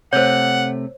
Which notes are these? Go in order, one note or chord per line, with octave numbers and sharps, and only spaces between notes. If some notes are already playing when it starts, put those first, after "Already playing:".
C3 A3 C5 C#5 F#5